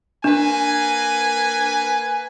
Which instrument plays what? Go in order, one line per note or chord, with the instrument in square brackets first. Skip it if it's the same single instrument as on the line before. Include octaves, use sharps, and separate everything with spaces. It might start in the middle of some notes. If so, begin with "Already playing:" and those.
[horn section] A#3 B4 G#5 [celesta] D4